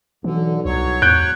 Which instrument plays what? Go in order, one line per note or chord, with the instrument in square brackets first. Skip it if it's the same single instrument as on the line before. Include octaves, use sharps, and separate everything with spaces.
[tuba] B1 [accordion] D3 [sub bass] E3
[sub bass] C2 [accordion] F#3 C#5
[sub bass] E2 [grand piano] F#6 G6 D7